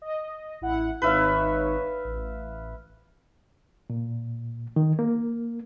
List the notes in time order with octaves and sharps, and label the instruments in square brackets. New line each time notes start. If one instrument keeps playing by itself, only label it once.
[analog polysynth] D#5
A1 E4 F#5
[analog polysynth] G#1 D#4 C#5 [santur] B4 E5 F5
[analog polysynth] A1
[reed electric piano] A#2
D#3
A#3